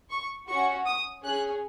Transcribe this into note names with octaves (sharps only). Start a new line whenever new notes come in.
C#6
C#4 F#4 C#6
D#6
C#4 G#4 F#6